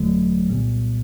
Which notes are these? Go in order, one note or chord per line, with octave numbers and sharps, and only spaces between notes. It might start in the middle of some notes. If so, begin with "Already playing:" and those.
Already playing: G1 F2 D3 F#3 A3
C2 A#2 G3 B3